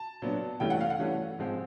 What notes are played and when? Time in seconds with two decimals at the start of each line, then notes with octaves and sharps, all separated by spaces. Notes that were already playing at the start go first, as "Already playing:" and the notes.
Already playing: A5
0.22 A#2 F#3 B3 D4
0.60 G2 E3 A3 C#4 G5
0.70 F#5
0.81 F5
0.90 F#5
0.99 G2 E3 A3 C#4
1.39 G#2 F3 G#3 C4